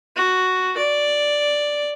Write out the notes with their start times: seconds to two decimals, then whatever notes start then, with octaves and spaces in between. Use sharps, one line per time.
0.16 F#4
0.77 D5